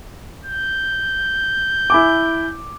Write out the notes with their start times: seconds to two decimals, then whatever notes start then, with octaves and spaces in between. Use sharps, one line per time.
0.45 G6
1.90 E4 G#5 D6